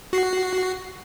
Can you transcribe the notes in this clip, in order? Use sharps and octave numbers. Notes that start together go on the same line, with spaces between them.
F#4 C7